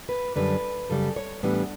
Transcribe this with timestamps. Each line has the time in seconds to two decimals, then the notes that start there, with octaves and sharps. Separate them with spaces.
0.09 B4
0.36 F#2 D3 G3 D4 B4
0.90 F#2 C#3 G3 A4
1.16 C#5
1.43 A2 E3 G3 B3 D4 F#5